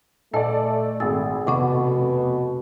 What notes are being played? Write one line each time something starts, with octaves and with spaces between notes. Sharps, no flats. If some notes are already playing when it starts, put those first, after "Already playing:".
A#2 A3 A4 D5 D#5 G#5
G#1 G#4 G#5 E6 A6
F1 B2 F#5 C#6 D6